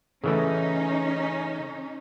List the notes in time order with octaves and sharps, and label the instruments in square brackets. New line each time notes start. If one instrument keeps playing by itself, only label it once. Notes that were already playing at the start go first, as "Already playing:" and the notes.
[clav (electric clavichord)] C#3 E3 A3 [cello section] C#4 D#4